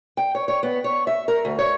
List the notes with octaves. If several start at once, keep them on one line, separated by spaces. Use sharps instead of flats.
G5
C#5
C#5
B3
C#5
E5
A#4
D2
C#5